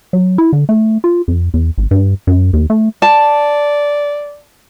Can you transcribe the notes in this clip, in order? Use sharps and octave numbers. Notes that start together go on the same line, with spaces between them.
F#3
E4
D3
A3
F4
F2
E2
G#1
G2
F#2
D#2
A3
D5 A5